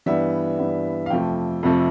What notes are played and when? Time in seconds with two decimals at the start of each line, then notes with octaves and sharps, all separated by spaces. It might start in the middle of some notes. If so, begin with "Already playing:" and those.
0.06 G2 E3 G3 B3 E5
0.59 G2 E3 G3 B3
1.06 F5
1.10 F2 C3 F3 A3 G5
1.63 F2 C3 F3 A3